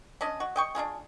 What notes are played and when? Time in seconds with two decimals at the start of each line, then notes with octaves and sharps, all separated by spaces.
0.21 C#4 D4 D#5
0.40 F#4
0.56 D#5 G5 C#6
0.75 D4 D#4 F4 G#4